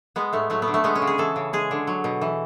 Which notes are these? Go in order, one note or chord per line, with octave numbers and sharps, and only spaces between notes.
G#3 B3
A2 A3
F#3 A3
B3
D3
A3
G#3 B3
C#4
C#3
G#4
E3 A4
C#3
G#3 G#4
D3
F#3
B2
E3